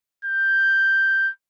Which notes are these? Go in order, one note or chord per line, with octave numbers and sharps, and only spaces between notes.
G6